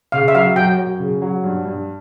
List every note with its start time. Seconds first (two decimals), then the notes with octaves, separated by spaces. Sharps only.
0.12 C#3 F5
0.28 E5
0.34 F#3 F5
0.56 F#2 G5
0.78 F#2
1.00 C#3
1.22 F#3
1.44 G2
1.65 G2